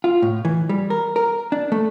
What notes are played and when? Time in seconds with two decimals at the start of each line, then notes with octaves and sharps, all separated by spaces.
0.04 F4
0.22 A2
0.45 E3
0.69 G3
0.90 A#4
1.16 A#4
1.52 D4
1.72 A3